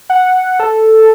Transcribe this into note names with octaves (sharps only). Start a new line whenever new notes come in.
F#5
A4